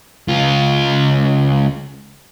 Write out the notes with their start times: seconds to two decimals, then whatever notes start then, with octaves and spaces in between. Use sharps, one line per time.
0.28 C#2 F4